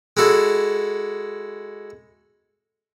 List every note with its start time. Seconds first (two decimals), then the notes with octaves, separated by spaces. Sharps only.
0.17 G#3 E4 F#4 A4